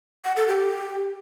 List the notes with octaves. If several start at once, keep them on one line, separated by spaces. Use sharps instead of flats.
F#5
A4
G4